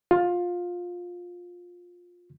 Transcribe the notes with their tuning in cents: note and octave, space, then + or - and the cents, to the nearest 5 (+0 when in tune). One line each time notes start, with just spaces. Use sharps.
F4 +15